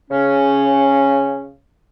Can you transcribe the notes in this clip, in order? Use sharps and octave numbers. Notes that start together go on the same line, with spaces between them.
C#3 C#4